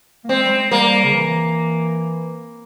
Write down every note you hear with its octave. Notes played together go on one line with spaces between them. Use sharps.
A#3
G#3 C4
G3
G#3
G3 A#3
C#3
E3